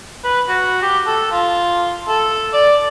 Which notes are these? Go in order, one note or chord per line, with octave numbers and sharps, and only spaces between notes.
B4
F#4
G4
A4
F4
A4
D5